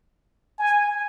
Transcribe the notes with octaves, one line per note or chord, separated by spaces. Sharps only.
G#5